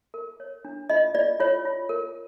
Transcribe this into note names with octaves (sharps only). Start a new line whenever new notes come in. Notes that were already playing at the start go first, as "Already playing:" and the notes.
A#4
C#5
D4
F4 D#5
F4 D5
F4 C#5
F4
A#4